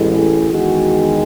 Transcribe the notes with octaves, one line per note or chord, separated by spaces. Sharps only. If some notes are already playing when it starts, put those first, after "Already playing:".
Already playing: A1 A2 G#3
G#4
E2 D#3 G#3 F#4